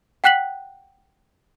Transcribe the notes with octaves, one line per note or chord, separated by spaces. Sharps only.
F#5 G5 F#6 B6 F#7